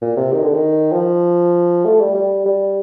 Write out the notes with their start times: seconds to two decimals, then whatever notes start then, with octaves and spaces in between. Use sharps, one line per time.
0.02 A#2
0.17 C3
0.33 D#3
0.43 D3
0.54 D#3
0.92 F3
1.85 A3
2.00 G3
2.15 G3
2.46 G3